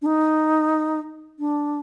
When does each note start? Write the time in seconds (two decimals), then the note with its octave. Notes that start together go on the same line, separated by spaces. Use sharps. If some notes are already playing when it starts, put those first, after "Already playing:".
0.02 D4
0.06 D#4
1.39 D4